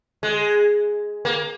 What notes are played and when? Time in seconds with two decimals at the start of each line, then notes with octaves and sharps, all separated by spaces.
0.23 G#3
1.25 A#3